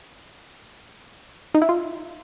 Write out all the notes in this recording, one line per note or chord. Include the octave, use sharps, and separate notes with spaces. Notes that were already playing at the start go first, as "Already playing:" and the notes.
D#4
E4
F4